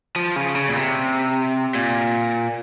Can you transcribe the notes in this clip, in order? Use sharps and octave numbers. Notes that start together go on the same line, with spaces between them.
F3
C#3
C#3
A#2
C3
A#2